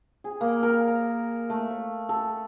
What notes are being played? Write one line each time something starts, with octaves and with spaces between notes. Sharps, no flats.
G#4
A#3
A#4
A#5
A3
C#6
A4